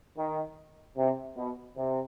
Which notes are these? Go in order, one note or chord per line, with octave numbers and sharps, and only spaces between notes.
D#3
C3
B2
C3